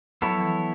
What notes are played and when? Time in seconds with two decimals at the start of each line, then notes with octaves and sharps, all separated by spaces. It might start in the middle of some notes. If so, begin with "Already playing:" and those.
0.22 F#3 B3 E4 A4 C#5
0.32 F3
0.40 E3
0.48 F3